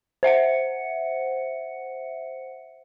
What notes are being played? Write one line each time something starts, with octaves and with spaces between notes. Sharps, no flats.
C5 E5 F#5 C#7